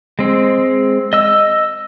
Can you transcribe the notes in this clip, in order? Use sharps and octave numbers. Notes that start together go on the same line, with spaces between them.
G#3 C4
D#5 E6